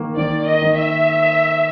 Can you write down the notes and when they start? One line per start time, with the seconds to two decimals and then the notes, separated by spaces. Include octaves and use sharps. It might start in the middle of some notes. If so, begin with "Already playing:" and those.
Already playing: D#3 A#3
0.17 D#3 D5
0.47 D#5
0.62 D#3
0.76 E5